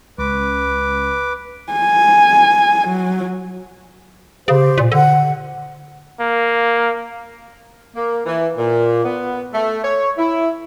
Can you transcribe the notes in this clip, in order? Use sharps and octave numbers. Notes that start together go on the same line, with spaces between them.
C#2 B4 D6
G#5
F#3
C#3 G4 C5
A#2
D3 F#5
A#3
A#3
E3
A#2
B3
A3
C#5
E4